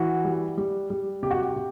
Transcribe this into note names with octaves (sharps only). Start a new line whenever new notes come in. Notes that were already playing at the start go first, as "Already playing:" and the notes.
Already playing: E3 F#4
G3
G3
G3
C3 G4
F#4
G4
C3